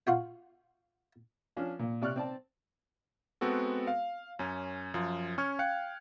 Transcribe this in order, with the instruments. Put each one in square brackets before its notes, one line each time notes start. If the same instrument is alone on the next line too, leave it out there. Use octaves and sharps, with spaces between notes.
[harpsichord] F4 F#4 G5
[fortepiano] F3 C#4 D4
A#2
C3 D5 C#6 F6 F#6
C4 D5 A5
[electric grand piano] G#3 B3 C4 F#4 A4
F5
F#2 C#4
F#2 F3
C#4 C#6 F6 G#6
F5 G5 F#6 C#7